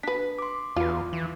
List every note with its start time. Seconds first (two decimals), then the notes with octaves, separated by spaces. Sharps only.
0.03 D4 B4 B6
0.39 C6 D6
0.76 E2 F4 B4
1.13 E3